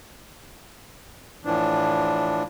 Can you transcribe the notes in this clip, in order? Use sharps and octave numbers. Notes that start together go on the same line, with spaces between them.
A2 E3 F3 D4